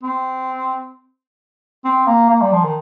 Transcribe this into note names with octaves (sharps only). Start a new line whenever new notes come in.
C4
C4
A#3
A#3
G3
F3
D#3